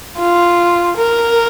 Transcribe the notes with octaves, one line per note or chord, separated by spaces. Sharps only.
F4
A#4